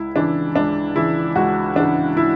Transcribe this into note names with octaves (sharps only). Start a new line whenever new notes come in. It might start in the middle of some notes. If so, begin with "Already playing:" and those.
Already playing: C#2 E4
C#3 E3 D4
C#2 D4
C#3 E3 E4
C#2 F#4
C#3 E3 D4
E4